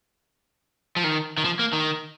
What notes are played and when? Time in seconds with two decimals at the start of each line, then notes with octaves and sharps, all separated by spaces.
0.96 F3
1.04 D#3
1.37 D#3
1.45 F3
1.59 A#3
1.73 D#3